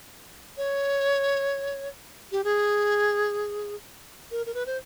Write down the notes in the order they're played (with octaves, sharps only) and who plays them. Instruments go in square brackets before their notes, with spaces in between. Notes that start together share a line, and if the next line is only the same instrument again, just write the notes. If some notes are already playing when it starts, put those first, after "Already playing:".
[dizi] C#5
G4
G#4
A#4
A#4
B4
C5